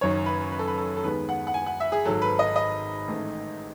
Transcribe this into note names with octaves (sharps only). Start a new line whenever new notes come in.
F#1 F#2 D#3 C#5
B4
B4
A4
B4
A4
A4
D#2 D#3 G#3 B3 B4
F#5
F#5
G#5
F#5
E5
G#4
G#1 G#2 F#3 A4
B4
D#5
D#5
A1 G#2 D#3 A3